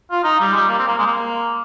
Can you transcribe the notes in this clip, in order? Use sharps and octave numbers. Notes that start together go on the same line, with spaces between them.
F4
D#4
G3
G#3
G3
A#3
C4
A#3
G#3
A#3